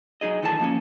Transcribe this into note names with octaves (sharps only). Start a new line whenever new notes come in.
F#3 D#4 G#4 D#5
D2 D#3 E3 A4 A#4 A5
F3 A#3 C4 C#4